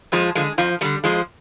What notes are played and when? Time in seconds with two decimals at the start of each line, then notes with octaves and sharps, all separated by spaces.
0.12 F2 F3 G#3
0.35 D3 F3 G#3
0.58 F2 F3
0.81 D3 F3 G3
1.04 F2 F3 G#3